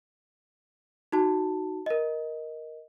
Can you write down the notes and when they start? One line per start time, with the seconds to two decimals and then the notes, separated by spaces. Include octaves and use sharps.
1.12 D#4 F#4 A5
1.86 A#4 D#5